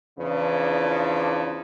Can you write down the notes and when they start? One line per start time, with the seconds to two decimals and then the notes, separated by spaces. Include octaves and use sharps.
0.19 E2 C#3 F3 D4 E4